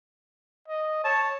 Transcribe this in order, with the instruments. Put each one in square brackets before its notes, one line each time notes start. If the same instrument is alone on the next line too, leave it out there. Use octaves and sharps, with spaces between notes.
[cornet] D#5
[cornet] C#5 [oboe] A5